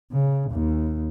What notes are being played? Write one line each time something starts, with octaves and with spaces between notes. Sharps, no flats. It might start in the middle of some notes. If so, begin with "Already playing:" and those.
C#3
D#2